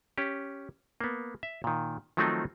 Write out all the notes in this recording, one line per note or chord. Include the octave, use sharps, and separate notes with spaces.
C#4 G4
A#3 B3
E5
A#2 D#3
D#3 F3 F#3 A3 C4 D#4